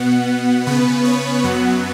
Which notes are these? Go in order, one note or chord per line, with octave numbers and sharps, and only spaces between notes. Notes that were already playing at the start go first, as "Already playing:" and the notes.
Already playing: B2 B3 F#5
C#3 B3 B4
C#5
F#2 F#3 B3 F#5